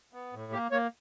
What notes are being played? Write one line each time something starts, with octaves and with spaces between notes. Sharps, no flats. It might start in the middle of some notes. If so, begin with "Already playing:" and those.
B3
A2
A#3 G4
A#3 C#5